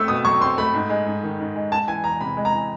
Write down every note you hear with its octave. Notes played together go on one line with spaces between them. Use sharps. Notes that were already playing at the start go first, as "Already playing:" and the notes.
Already playing: A3 C4 E6
B2 D#6
F#3 C#6
C4 C6
A3 B5
G#2
G#3
G#2
D#3
G#2
G#3
G#3 A5
E3 G#5
E2 A#5
C3 B5
G#3
A#5
E3